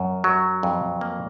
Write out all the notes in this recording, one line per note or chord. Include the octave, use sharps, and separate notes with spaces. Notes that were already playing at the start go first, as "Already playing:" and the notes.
Already playing: F#2
F#3
F2
A#3